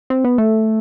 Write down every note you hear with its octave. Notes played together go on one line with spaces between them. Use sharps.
C4
B3
A3